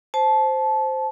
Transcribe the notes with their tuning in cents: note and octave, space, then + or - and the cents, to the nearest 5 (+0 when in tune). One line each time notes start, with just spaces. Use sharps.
C5 +0 A5 -20